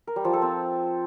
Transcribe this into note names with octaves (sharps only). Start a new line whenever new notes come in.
A#4
G3
F3
A4
C4